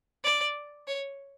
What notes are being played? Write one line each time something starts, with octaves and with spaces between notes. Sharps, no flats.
D5
C#5